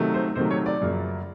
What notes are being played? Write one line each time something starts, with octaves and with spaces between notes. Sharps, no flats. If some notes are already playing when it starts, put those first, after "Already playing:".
Already playing: C3 D#3 F#3 A3
C5
C3 D#3 F#3 A3 C5
C#5
D5
F#2 C#3 F3 A#3